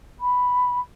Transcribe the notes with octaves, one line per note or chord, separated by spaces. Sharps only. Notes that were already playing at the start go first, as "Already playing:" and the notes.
B5